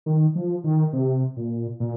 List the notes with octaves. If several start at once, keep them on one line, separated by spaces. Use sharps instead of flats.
D#3
F3
D#3
C3
A#2
A#2